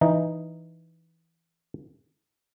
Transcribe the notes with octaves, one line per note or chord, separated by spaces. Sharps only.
E3 D#4